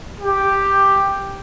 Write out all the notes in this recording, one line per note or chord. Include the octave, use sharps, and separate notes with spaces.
G4